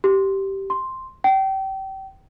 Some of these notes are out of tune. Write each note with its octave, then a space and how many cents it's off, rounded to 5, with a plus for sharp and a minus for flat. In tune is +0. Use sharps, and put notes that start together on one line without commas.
G4 -10
C6 +0
G5 -30